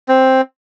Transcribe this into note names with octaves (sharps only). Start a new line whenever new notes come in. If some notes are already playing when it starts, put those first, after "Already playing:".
C4